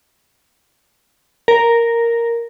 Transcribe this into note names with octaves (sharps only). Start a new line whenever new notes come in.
A#4